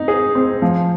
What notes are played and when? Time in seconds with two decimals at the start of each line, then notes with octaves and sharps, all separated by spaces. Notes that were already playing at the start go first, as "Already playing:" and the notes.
Already playing: D#4
0.08 G#4
0.35 C4
0.62 F3